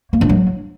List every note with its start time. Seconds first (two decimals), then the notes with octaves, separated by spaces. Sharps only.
0.13 A#3
0.21 D4
0.29 F#3